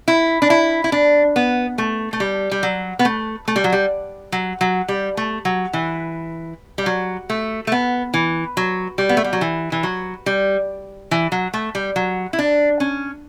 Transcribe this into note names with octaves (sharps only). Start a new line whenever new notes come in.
E4
D4
E4
E4
D4
B3
A3
A3
G3
G3
F#3
B3
A3
A3
G3
F#3
G3
F#3
F#3
G3
A3
F#3
E3
G3
F#3
A3
A3
B3
E3
F#3
G3
B3
A3
G3
F#3
E3
E3
F#3
G3
E3
F#3
A3
G3
F#3
E4
D4
C#4